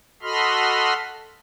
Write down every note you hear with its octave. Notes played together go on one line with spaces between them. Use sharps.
F#4 A4 D#5 B5 C6 F6